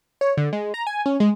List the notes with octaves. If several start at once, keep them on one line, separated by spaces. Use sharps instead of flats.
C#5
D3
G#3
A#5
G#5
C#4
G#3